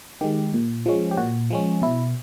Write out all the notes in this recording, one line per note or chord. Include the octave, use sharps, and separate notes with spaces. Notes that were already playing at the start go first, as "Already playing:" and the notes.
D#3 G#3 G4
A#2
F3 G#3 C#4
G4
A#2 F#4
F3 G#3 C#4
B2 E4